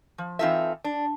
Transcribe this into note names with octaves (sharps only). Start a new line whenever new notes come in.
F3
E3 C4 D#4 F4 A4 E5
D4